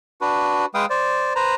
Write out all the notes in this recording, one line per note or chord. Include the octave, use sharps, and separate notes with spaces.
D4 F#4 B4
G#3 B4 F5 G5 D#6
C5 D5
B4 C5 A#5